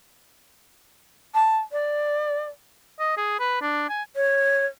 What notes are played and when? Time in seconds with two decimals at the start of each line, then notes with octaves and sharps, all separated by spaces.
1.34 A5
1.72 D5
3.00 D#5
3.17 G#4
3.40 B4
3.61 D4
3.89 G#5
4.14 C#5